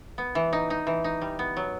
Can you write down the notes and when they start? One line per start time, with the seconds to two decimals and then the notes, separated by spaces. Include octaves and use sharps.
0.18 B3
0.35 E3
0.53 D#4
0.70 D#4
0.87 E3
1.04 D#4
1.22 G3
1.39 B3
1.57 F#3